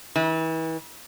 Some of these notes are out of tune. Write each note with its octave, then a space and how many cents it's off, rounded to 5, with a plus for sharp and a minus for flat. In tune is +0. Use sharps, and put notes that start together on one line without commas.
E3 -35